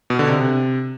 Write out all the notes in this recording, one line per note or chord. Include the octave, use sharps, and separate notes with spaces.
B2
D3
C3